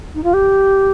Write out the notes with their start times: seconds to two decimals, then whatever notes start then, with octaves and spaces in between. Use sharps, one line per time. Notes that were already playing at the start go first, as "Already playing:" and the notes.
0.15 D#4
0.24 F4
0.34 G4